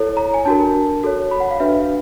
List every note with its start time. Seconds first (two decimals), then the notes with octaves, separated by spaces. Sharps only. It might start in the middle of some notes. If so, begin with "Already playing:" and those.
Already playing: E4 A4 C#5
0.17 A#5
0.34 G#5
0.45 D4 F#4 A#4 A5
1.03 F#4 A4 C#5
1.31 B5
1.40 F#5
1.51 F5
1.60 D4 F#4 B4 E5